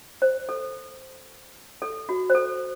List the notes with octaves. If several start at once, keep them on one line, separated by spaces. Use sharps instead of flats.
C5
A4
A4
F#4
C5
A4